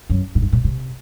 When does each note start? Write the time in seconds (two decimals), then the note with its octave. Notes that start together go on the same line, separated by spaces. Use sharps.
0.10 F#2
0.35 A#2
0.42 G#2
0.53 A#2
0.64 C3